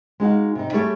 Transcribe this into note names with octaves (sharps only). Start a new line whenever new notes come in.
G#3 D#4 F#4 F5
C3 D#4
G3 A3 G4 G#4 C#5 E5